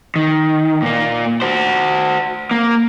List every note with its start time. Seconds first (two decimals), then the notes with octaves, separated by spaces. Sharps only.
0.16 D#3
0.82 A#2 A#3
1.42 F#4 C5
2.51 A#3